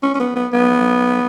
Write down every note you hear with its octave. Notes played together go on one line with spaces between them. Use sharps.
C#4
C#4
B3
B3
B3